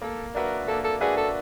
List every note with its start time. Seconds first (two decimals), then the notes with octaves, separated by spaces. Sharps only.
0.02 A#3 A4
0.35 D4 F#4 A#4 B4 E5
0.68 A#3 A4
0.84 A4
1.01 D4 F#4 G#4 B4 E5
1.17 A4